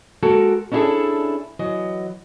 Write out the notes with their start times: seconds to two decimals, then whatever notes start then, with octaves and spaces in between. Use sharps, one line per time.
0.23 G#3 A#3 F#4 A4 A#4
0.72 C#4 D4 E4 F#4 G#4 A4
1.59 E3 F#3 D#5